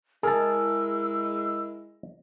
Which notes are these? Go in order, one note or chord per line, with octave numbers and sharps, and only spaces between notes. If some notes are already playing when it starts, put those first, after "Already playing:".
G#3 E4 G#4 A#4 A5 E6